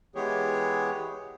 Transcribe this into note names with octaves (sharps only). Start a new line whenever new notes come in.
E3 G#3 B3 G4 G#4 C#5